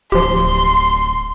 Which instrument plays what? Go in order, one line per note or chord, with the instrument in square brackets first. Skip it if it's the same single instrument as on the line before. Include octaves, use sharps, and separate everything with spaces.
[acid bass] D1 [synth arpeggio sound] F3 G4 [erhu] C6